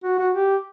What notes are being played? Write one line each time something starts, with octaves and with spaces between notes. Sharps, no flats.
F#4
F#4
G4